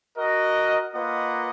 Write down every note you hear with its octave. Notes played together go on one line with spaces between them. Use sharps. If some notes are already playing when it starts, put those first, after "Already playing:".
F#4 A#4 D#5
A#3 F4 B4 D#5 F#5